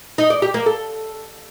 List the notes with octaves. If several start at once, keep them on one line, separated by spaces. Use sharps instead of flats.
D#4
D5
G4
A#3
A4